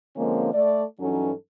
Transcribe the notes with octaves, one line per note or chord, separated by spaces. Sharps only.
D3 F3 G#3 A#3 C4 C#4
A3 D5
G2 E3 F#3 C#4 D#4 A4